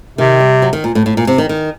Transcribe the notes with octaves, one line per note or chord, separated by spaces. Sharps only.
C3 D#3
G3
F#3
D#3
A#2
A2
A2
A#2
C3
D#3
D#3